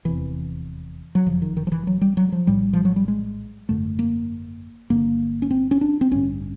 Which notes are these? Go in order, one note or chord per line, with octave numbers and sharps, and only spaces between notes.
F1 E2 C3 E3
F#3
F#1 F2 C#3 F3
D#3
D#3
F3
E3
F#3
G3
F#3
F3
A#1 A2 G3
F3
F#3
G3
G#3
G#1 F#2 D3 A3
A#3
G1 G2 D3 A#3
C#4
C4
C#4
D4
C4
A1 G2 D3 C#4